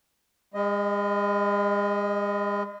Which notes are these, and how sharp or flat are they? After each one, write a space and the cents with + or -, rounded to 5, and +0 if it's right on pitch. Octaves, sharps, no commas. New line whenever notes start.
G#3 -40 D#5 +5